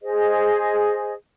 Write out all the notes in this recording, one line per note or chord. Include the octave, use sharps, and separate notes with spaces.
G#4 C5 D#5